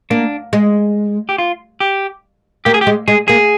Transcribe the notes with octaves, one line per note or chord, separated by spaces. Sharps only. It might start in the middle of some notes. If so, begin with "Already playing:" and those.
A#3 D4
G#3
G4
F4
G4
A#3 G4
G#4
G4
G#3
G#3 G#4
A#3 G#4